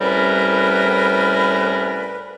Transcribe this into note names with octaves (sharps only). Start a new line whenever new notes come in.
C2 A2 G3 C#4 A#4 B4